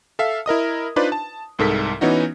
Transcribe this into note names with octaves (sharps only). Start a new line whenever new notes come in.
A4 E5 F5
E4 A#4 D#5 D#6
D4 D#4 F4 B4 C5 D5
A5
C2 G#2 A4 A#4 B6
E3 B3 C#4 D#4 F#4